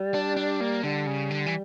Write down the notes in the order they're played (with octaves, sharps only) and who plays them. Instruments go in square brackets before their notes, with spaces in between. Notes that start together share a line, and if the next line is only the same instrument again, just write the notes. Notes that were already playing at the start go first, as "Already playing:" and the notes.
Already playing: [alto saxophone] G3
[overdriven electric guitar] D4
D4
A#3
[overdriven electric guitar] D3 [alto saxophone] G3
[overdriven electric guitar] C#3
D3
E3